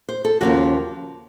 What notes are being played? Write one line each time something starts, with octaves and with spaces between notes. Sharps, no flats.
C5
A4
D#2 C#3 F3 A#3 C#4 F#4